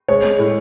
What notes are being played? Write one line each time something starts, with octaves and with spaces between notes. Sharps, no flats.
G#3 C#5
G#3
A2